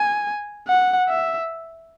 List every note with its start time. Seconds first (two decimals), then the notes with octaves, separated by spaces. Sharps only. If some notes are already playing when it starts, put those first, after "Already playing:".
Already playing: G#5
0.68 F#5
1.09 E5